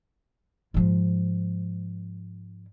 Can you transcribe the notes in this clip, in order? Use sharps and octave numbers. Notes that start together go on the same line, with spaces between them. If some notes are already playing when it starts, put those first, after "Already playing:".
G#2 F3